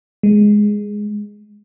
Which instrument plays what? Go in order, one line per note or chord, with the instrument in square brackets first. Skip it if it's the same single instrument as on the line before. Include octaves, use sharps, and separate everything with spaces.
[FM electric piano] G#3